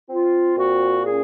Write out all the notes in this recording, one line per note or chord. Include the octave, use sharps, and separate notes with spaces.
C4 F4
A#2 F#4
C#4 G#4